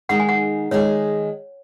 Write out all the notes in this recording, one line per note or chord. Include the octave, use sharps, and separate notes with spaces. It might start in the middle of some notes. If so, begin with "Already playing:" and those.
D#3 G#3 D#4 G#4 F#5
G#5
F#5
D#3 G#3 D#4 G#4 C#5